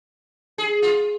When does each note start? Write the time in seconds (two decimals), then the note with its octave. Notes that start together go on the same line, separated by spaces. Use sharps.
0.58 G#4
0.82 F4